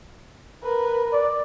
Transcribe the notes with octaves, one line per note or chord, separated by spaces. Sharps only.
A#4 B4
D5